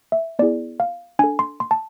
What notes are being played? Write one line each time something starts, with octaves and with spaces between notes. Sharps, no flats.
E5
B3 E4 G#4 D5
F5
D4 A4 G#5
C6
C6
A5